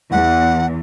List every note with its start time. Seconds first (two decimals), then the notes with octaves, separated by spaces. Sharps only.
0.12 E2 F#5